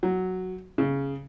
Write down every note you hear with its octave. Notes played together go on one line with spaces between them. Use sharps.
F#3
C#3